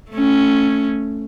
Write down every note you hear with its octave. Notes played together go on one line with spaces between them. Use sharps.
A3 C#4